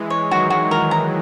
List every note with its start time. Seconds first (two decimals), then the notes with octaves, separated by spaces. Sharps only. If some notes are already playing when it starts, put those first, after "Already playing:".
Already playing: E3 G#3
0.10 C#5
0.31 D#3 F#3 F#4
0.50 F#4
0.71 A#4
0.91 A#5